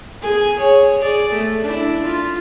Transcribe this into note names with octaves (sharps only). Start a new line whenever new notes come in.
G#4 G#5
G#4 C#5
G#4 D5
A3
D4 E4
F4